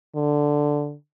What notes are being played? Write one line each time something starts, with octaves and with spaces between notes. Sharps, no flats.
D3